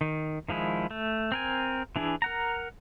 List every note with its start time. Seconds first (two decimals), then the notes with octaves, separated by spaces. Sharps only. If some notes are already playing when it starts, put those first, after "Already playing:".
0.01 D#3
0.49 D#3 F3 G#3 E4
0.91 A3
1.32 C4 A#4 G#5
1.96 E3 D4 E4 G#4
2.22 A#4 F#5 A#5